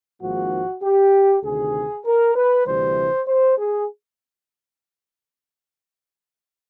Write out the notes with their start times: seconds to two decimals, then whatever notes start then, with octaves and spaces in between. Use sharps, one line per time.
0.21 G#1 G#2 F3 A#3 F#4
0.83 G4
1.43 D2 C3 D#3 G#4
2.05 A#4
2.35 B4
2.66 D2 C3 E3 G3 C5
3.27 C5
3.58 G#4